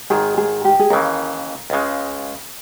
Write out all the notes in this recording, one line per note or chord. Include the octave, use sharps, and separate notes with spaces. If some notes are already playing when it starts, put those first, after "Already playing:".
G#1 G#2 D#3 G#4
G#4
G4
G#4
D#2 C#3 E3 A#4
C#2 C#3 G#3